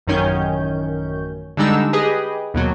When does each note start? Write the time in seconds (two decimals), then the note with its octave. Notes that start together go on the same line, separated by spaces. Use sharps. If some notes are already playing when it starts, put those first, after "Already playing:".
0.07 A1 F#2 D#3 C#4 G6
1.57 D3 G3 G#3 D4 D#4 E6
1.93 G4 G#4 B4 D#5
2.54 D#2 B2 F#3